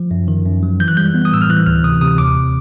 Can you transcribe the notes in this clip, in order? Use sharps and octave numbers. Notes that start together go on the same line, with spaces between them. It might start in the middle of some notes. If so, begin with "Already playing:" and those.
Already playing: F3
F#2
D#3
F#2
F#3
E3 G6
F#6
G3 G6
B3
D#6
A2 E6
F6
E3 F#6
D2 F6
C3 D#6
C3 D#6
D#2 D6